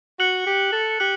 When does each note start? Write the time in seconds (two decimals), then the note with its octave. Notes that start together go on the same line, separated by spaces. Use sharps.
0.19 F#4 F#6 C#7 F#7
0.46 G4
0.73 A4
1.00 G4 F#6 C#7 F#7